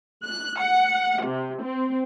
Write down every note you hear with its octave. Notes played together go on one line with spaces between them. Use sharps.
F#6
F#5
C3
C4